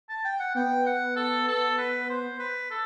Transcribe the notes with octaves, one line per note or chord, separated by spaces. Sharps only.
A5
G5
F#5
B3 G5
F#5
A4
A4
B4
C5
B4
A4